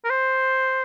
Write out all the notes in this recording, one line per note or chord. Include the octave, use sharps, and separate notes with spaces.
A#4
C5